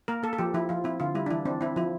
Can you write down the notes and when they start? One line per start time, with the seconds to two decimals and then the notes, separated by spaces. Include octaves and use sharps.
0.08 A#3 A#4
0.23 A#3 A4
0.33 A4
0.38 F3 G4
0.54 F3 E4
0.69 F3 F4
0.84 C4 E4
1.00 D3 F4
1.15 G3 E4
1.26 D4
1.31 E3 E4
1.45 C4 D4
1.61 C4 E4
1.76 F3 E4